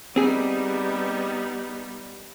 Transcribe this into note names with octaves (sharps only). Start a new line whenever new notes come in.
G3 B3 C4 D#4 G#4